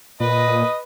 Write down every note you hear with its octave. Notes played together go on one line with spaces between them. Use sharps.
A#2 B4 D#5